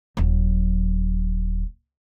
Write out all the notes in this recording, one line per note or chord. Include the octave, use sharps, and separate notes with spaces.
D#1 F#3